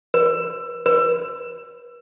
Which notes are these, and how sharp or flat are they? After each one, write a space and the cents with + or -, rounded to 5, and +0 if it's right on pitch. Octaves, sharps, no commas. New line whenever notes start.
B4 -45
B4 -40